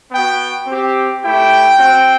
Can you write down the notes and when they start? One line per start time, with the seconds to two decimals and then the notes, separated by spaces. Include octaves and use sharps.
0.11 B3 F#4 G5
0.67 C4 G4
1.23 A3 E4 G4 G5
1.79 C4 F#4